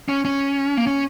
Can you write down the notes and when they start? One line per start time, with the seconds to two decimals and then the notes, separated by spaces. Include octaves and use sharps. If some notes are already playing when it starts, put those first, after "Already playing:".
0.08 C#4
0.25 C#4
0.77 A#3
0.87 C#4